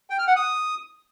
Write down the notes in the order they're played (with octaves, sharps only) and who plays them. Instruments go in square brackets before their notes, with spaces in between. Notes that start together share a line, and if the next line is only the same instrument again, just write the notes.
[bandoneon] G5
F6
F#5
D#6